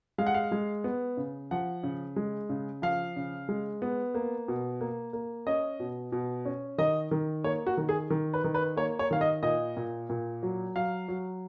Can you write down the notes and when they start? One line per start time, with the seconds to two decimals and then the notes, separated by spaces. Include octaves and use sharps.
0.18 G#3 F5
0.27 F#5
0.34 F5
0.52 G#3
0.84 B3
1.17 C#3
1.51 F3 F#5
1.83 C#3
2.16 G#3
2.49 C#3
2.82 F3 F5
3.16 C#3
3.49 G#3
3.82 B3
4.14 A#3
4.48 B2
4.81 A#3
5.13 A#3
5.47 C#4 D#5
5.80 B2
6.12 B2
6.45 C#4
6.78 D#3 D#5
7.11 D#3
7.44 A#3 C#5
7.67 F#4
7.77 D#3
7.89 G#4
8.10 D#3
8.34 B4
8.44 D#3
8.54 B4
8.76 A#3 C#5
8.99 C#5
9.11 D#3 F5
9.21 D#5
9.43 A#2 D#5
9.77 A#2
10.10 A#2
10.43 F#3
10.76 F#3 F5
11.08 F#3